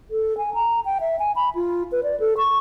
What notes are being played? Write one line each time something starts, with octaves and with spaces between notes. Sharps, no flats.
A4
G#5
A#5
G5
E5
G#5
B5
F4
B4
D5
A4
C#6